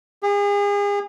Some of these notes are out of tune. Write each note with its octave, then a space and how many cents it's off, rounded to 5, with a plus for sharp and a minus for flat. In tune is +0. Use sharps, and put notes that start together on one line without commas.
G#4 -40